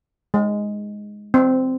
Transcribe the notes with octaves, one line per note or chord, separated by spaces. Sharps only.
G#3
C4